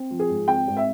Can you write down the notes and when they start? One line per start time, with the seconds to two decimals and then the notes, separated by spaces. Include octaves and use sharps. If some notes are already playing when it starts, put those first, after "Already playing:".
Already playing: C4
0.11 F3
0.19 G#4
0.29 G#1
0.48 C4 G5
0.68 G#1
0.77 E5